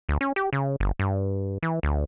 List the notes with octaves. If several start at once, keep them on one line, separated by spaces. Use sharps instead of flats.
D2
C#4
G4
C#3
G1
G2
E3
D2